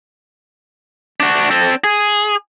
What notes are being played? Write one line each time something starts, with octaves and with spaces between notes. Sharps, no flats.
D4 F#4
C4 A4
G#4